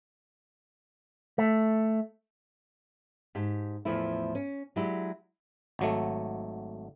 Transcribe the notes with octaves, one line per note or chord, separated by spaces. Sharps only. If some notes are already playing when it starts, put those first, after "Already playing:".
A3
G#2 G4 A5
E2 A2 F3 A3 E4
C#4
F#3 G#3 D4 E4 G4
G#1 F#3 A3